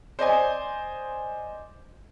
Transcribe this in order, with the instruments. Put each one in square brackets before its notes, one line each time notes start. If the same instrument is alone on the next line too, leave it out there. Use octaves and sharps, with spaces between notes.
[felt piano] C5 D5 D#5 G#5